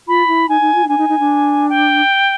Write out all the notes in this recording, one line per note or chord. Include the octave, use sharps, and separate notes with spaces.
F4 B5
E4
D#4 G#5
D#4
F4
D#4
D4 G#5
D#4
D#4
D4
G5